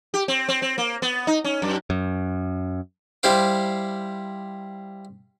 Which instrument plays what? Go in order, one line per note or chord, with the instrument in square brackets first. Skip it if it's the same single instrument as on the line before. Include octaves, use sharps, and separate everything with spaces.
[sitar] G4
C4
C4
C4
A#3
B3
D#4
C#4
F#2
[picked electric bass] F#2
[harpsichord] G3 E4 C5 F5 D6